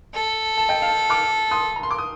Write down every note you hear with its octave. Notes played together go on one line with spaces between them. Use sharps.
A4
A5
D#5 G5
F5 A5
D6 F6
C6 D#6
A#5
C6
D6
D#6